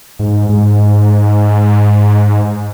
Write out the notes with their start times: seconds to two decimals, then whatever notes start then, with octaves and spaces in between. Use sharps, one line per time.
0.19 G#2
0.49 G#2